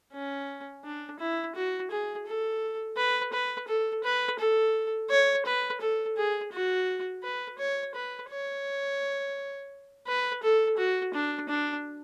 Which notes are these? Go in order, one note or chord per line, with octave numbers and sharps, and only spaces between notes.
C#4
D4
E4
F#4
G#4
A4
B4
B4
A4
B4
A4
C#5
B4
A4
G#4
F#4
B4
C#5
B4
C#5
B4
A4
F#4
D4
D4